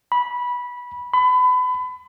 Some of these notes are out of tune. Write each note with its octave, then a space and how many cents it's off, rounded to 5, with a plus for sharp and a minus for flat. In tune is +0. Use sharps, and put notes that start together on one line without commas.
B5 -15
B5 +30